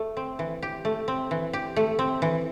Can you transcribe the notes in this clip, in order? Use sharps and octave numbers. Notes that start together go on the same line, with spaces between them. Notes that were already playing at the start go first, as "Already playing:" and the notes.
Already playing: A3
C4
E3
G4
A3
C4
E3
G4
A3
C4
E3